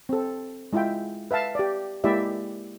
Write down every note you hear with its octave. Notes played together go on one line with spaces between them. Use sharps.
C4 A4
G#3 E4 F4 E5 G5
B4 E5 F5 A5
G4 D5
G#3 A#3 E4 G4 D5 E5